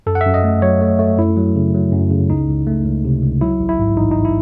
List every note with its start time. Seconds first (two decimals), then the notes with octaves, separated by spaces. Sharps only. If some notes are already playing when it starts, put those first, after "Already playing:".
0.06 F#2 A4
0.15 F#5
0.21 F#2 E5
0.34 D#5
0.44 A3
0.62 F#3 C#5
0.81 A3
0.99 A3
1.17 F#2 E4
1.37 F#3
1.56 C#3
1.74 F#3
1.92 F#2
2.11 C#3
2.29 C#2 D#4
2.49 C#2
2.67 A3
2.85 C#2
3.05 C3
3.23 C#2
3.41 F#3 E4
3.60 A1
3.69 E4
3.79 G#2
3.97 A1 D#4
4.11 D#4
4.16 A1
4.25 E4